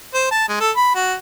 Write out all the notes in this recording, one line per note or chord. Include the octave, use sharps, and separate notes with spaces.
C5
A5
G#3
A4
B5
F#4